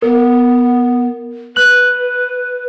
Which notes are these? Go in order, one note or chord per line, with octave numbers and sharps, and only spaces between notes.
B3 A#4
B4 F#6 F#7